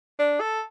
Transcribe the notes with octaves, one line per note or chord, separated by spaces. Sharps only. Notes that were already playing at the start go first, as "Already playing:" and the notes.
D4
A4